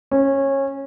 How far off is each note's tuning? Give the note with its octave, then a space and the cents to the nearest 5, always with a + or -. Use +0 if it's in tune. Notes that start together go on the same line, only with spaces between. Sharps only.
C#4 -20